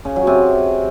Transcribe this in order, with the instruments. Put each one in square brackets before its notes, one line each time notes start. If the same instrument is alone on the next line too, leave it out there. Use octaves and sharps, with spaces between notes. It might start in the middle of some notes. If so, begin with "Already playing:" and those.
[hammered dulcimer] C#3
F#3
C3